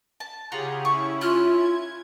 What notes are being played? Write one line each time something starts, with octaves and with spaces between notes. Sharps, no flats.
A5
C#3 F4 G4 G#4 F#5 A#5
C#4 E4 C#6
F4 F6 F#6
G#6